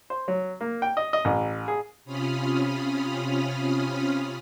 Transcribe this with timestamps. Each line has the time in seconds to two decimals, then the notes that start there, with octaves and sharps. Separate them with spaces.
0.10 C5
0.28 F#3
0.61 A#3
0.82 G5
0.97 D#5
1.13 D#5
1.25 A1
1.68 G#4
2.05 C3 C#4 F4 B5 D#6 F6